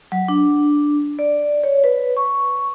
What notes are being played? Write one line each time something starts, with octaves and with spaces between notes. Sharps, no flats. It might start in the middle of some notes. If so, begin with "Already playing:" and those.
F#3
D4
D5
C#5
B4
C#6